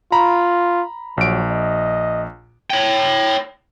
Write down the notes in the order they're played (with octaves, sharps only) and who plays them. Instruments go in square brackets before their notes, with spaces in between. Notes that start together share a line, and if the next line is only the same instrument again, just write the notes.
[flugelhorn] F4 [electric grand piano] A#5 B5
[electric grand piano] A#1 D7 [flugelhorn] F#3
[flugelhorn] D#5
[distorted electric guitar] C#5 G5